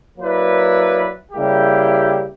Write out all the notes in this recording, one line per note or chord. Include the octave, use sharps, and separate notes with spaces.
F#3 A#3 E4 B4 D5
C#3 G3 A#3 E4 G4